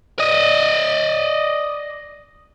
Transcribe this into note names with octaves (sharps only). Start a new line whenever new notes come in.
D5 D#5